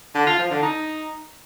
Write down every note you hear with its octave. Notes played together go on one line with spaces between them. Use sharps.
D3
F4
F3
D3
D#4